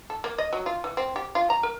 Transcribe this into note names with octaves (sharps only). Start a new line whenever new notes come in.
A4
A#3
D#5
F#3
F4
E3
C4
G4
F4
A#5
A#4